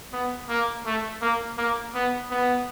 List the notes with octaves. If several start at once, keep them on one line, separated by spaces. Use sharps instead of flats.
B3
A#3
A3
A#3
A#3
B3
B3